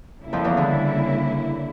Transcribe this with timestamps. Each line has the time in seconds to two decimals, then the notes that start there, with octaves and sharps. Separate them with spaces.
0.21 C#3 G3 A#3 E4
0.33 F2 F3
0.44 E2 E3
0.57 D3